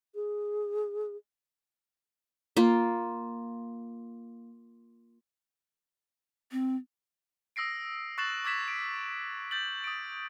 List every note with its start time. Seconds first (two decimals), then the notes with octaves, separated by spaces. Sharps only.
0.15 G#4
2.57 A#3 F4
6.52 C4
7.56 D#6 E6 A#6 C7 D7
8.18 C#6 F#6 A6 C7 E7 F#7
8.45 D6 E6 G#6 B6 E7
8.68 D7
9.51 G6 A6 F#7
9.84 D#6 D7